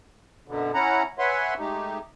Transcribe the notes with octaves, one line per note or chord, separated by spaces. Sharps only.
F#2 B2 D3
C#4 E4 F#5 A#5
B4 C#5 E5 F#5 G#5 C6
G#3 A3 D#4 G4